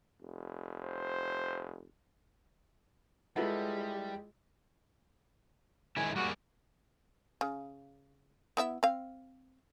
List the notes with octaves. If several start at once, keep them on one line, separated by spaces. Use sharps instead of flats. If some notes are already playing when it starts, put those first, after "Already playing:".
F1
C5
G3 G#3 E4 F4 A4 B4 D#5 F#5
D#3 G#3 E4 G#5
G3 A#3 F#4 G#4
C#3
B3 E4 E5
C4 F5